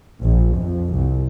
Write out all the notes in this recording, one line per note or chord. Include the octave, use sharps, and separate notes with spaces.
A#1
F2
C2